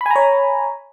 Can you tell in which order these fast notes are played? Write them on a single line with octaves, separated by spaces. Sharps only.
B5 G#5 A#5 C#5